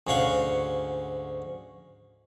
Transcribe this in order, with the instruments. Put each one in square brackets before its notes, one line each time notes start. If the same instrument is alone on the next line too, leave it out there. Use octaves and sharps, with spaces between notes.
[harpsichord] D2 G#2 C#4 F5 F#5 C#6